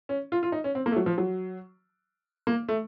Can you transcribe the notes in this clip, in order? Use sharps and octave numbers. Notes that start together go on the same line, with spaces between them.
C#4
F4
F4
D#4
C#4
C4
A#3
A3
F#3
F3
F#3
A#3
A3